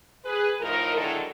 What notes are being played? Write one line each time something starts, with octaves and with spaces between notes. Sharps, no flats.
G#4 B4
A2 F3 D#4 A#4
D3 D#3 F#3 G#3 E4 A4